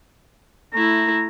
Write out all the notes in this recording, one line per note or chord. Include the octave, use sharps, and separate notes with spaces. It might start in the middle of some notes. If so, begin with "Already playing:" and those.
A3 E4 A#5